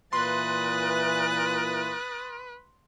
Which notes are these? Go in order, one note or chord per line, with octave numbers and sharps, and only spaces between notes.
A#2 E3 B4 C6 D#6 F#6 A6